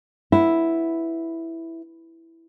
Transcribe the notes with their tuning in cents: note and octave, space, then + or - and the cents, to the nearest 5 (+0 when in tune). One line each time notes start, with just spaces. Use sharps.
E4 +0 B4 +0 F#5 +0